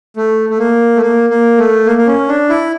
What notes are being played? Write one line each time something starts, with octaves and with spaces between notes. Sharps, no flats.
A3
A3
A#3
A3
A#3
A#3
A3
A#3
A#3
C#4
D4
E4